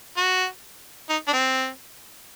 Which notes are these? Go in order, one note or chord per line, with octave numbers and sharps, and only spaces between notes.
F#4
D#4
D4
C4